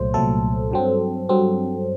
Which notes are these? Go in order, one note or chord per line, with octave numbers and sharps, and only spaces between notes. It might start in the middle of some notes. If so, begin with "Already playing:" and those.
Already playing: C2 A#2 F#3 A3 C5
C2 A#2 F#3 A3 A4
G2 F#3 C4
G2 F#3 C4